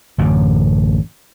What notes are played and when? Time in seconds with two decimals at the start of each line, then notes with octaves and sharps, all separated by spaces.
0.18 A1 F#2 D3